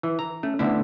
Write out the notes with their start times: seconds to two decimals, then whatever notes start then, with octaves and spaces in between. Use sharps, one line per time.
0.03 E3
0.19 A#5
0.43 A3 C#4
0.59 D2 D3 A3 B3 D4 E4